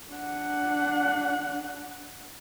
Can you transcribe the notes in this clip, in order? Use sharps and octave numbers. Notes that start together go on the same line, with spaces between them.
D4 F#5